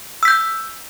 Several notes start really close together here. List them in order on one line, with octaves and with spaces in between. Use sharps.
E6 B6 G6